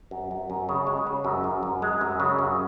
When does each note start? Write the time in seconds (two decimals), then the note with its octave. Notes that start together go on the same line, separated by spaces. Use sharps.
0.11 F#2
0.31 F#2
0.50 F#2
0.69 C#3
0.87 G#3
1.07 C#3
1.25 F#2
1.44 F#2
1.63 F#2
1.82 G#3
2.01 F#2
2.20 C#3
2.39 F#2